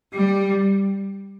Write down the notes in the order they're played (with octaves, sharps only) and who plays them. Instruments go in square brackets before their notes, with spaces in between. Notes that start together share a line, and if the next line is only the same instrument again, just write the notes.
[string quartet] G3